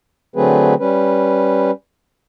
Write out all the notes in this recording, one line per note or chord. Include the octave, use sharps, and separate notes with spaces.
D3 F#3 A3 C4 G#4 B4
G3 C#4 B4